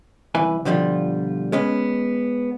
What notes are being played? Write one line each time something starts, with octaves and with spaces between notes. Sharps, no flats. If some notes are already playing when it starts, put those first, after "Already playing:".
C2 E3 B4 G#5
B2 D3 F3 G3 F4
G#3 B3 C#4